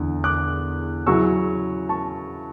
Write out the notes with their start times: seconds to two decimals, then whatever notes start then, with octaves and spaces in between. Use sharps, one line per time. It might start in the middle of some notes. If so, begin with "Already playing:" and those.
Already playing: E2 D3
0.24 D6 F#6
1.07 C#3 F#3 C#4 E4 C#6 E6
1.89 A5 C#6